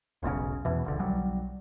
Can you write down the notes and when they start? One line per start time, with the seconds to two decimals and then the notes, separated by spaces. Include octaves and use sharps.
0.23 E1 B1 G#2 C#3
0.65 E2 B2 E3
0.85 D#1 C#2 D3
0.99 B1 F#3 G3